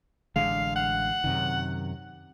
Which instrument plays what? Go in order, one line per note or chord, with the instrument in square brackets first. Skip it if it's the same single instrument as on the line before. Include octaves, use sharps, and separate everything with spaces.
[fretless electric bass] A1 D3 G#3 [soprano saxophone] F5
[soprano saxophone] F#5
[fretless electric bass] F#2 C3 D#3